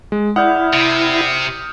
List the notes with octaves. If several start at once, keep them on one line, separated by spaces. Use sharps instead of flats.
G#3
E4 D5 F#5 D#6 F6 G6
C3